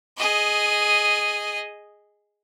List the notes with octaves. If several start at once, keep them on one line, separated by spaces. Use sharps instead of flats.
G#4 D#5